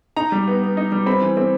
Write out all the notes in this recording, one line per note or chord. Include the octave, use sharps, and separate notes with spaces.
D#4 A#5
G3
B3
B3
D#4
G3
C4 B5
E3
C4